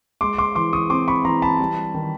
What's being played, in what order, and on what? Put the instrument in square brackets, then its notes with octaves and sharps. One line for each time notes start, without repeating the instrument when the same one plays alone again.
[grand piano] G#3 C6 D6
C6 D6
E3 C6 D6
C#6 D#6
C4 C6 D6
B5 C#6
E3 A#5 C6
A5 B5
G3
D#3